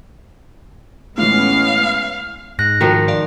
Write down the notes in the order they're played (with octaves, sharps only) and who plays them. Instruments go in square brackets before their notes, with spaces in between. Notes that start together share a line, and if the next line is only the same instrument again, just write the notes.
[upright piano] A2 E3 [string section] G#3 B3 C#4 [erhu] F5
[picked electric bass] G#2 [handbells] F#6 A#6
[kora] D#3 F3 [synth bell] F#4 A#4
[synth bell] D5 F5